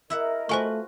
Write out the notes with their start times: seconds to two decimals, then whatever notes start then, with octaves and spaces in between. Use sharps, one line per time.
0.10 E4 A#4 D#5 E5 F#5
0.49 A3 F4 F#4 B4 C5 G#5 C#6